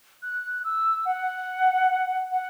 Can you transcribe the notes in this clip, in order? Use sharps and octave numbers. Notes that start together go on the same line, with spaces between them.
F#6
E6
F#5
F#5